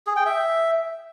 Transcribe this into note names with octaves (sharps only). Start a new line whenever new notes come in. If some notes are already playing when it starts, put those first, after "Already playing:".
G#4
G5
E5